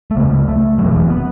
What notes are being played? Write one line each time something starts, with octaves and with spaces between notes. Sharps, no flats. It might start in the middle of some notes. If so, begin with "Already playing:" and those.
A3
C#2 C#3 B3
A3
E1 E2 B2 F#3
E3
B3